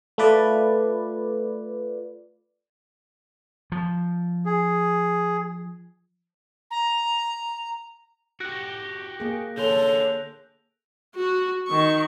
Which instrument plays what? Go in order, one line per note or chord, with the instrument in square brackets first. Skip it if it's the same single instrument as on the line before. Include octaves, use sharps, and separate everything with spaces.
[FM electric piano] A3 F4 B4 D5
[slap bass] F3
[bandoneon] G#4
[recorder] A#5
[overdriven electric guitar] F#4 G4 [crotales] F#6 A#6 D7
[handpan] A#3 G#4
[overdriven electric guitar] D3 C6 [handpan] A4 [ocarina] C#5 [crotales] G6 F7
[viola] F#4
D#3 C#6